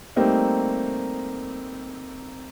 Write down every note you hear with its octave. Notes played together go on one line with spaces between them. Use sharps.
G3 A3 A#3 C4 D#4